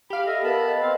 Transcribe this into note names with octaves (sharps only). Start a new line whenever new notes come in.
G4 F5 B5
A4 D#5 E5
B3 A#4 A5 B5
D#5
C4 F5